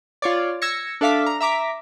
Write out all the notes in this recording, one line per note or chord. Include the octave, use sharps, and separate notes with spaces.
F4 C#5 D5
E6 G#6 A#6 C#7
D4 A4 E5 F5 D6 B6
A#5
E5 A#5 D6 B6